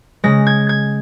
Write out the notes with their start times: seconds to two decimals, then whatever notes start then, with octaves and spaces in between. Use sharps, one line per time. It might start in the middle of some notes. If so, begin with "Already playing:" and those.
0.24 C#3 G#3 A#6
0.47 G#6
0.69 G#6